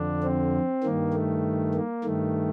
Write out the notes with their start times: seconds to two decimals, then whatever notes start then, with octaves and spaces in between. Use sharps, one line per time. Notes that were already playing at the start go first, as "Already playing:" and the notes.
Already playing: F2 D3 D4
0.24 C4
0.83 G2 D#3 A#3
1.14 A3
1.75 A#3
2.04 G2 D#3 A3